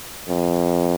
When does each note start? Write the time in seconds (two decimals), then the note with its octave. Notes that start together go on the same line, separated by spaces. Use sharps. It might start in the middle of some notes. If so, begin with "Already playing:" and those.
0.29 F2